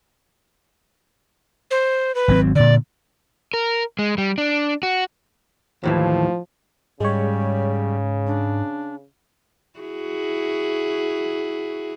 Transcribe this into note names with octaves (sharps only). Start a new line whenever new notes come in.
C5
B4
G#1 F#3 C4
A#2 D3 D5
A#4
G#3
G3
D4
F#4
D#2 A2 E3 F3
G#2 C#3 G3 G#3 C#5
D4
E4 F#4 G#4